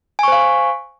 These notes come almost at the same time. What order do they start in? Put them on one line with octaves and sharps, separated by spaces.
G#5 C#6 C5 F5